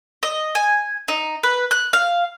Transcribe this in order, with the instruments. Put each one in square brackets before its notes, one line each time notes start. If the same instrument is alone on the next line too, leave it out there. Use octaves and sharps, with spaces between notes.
[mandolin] D#5
G#5
D#4
B4
F#6
F5